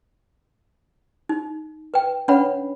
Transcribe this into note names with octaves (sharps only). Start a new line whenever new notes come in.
D#4
B4 G5
C#4 D4 B4 C#5 F#5 B5